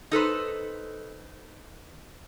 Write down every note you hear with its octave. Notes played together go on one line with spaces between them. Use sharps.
D#4 A4 B4 C5